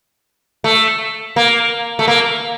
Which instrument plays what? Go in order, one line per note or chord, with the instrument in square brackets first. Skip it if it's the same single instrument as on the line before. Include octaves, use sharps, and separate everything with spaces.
[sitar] A3
A#3
A3
A#3